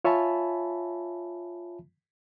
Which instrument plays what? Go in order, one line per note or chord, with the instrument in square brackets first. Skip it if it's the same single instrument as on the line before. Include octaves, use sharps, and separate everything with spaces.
[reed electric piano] F4 C#5 E5 G#5 A5 B5